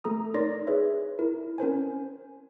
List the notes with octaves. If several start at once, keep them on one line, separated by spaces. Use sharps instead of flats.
A3 A4 A#5 D#6
D#4 A#4 C#5 D5 C6 A#6
G#4 B4 C#5 E5
E4 A#4
C#4 A#4 C5 G#5